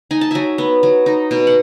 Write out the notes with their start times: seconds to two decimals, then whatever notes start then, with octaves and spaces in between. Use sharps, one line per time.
0.11 D#4 G#5
0.21 A5
0.31 F#3 E5 G#5
0.58 B3
0.83 F#3
1.06 D#4
1.31 B2
1.47 F#5